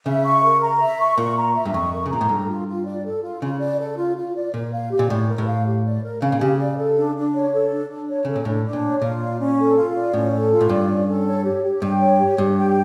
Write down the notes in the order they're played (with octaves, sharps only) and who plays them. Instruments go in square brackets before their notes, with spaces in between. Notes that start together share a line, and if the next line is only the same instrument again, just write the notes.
[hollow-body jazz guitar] C#3 [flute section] E5
[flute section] C#6
A#4
A#5
E5
C#6
[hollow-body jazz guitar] A#2 [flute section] A#4
[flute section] A#5
E5
[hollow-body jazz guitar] G2
[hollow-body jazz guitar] F2 [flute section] C#6
[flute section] A#4
[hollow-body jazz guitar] C#3
[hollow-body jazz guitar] A#2 [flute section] A#5
[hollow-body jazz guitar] A2
[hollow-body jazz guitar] G2 [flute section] A4
[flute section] F4
F4
D5
A4
F4
[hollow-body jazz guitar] C#3 [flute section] F4
[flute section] D5
A4
F4
F4
D5
[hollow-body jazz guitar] A#2 [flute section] A#4
[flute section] F5
G4
[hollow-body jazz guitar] A#2
[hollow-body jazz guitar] A2 [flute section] D5
[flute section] A#4
[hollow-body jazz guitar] A2
[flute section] F5
G4
D5
A#4
[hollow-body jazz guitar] C#3 [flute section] F5
[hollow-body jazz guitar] A#2
[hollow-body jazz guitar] C#3 [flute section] G4
[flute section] D5
A4
D4
D4
C#5
A4
D4
D4
C#5
[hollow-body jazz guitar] C#3 [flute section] A4
[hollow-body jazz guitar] A#2
[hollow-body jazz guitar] A2 [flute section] D4
[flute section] D4
[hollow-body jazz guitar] A#2
[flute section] C#5
[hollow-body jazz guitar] A#2 [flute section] F4
[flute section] D5
C#4
A4
F4
D5
[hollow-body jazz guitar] A2 [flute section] C#4
[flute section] A4
F4
[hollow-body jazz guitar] A2
[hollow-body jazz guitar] G2 [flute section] D5
[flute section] C#4
A4
C#5
G4
G4
[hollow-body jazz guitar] G2 [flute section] G5
[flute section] C#5
G4
[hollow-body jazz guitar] G2 [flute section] G4
[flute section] G5